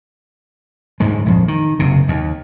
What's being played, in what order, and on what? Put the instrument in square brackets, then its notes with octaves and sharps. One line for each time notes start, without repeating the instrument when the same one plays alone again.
[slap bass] D2 G#2 G#3
A#1 F2
D#3
F#1 C3
D#2